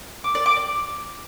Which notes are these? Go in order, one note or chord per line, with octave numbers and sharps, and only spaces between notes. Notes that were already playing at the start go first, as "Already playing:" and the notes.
D6
D5
D6
D5